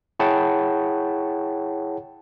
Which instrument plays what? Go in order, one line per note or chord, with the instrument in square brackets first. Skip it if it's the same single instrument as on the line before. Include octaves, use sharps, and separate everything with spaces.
[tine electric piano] E4 G#4 C#5 F#5 G5 A5